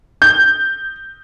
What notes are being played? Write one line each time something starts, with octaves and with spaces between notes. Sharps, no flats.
G6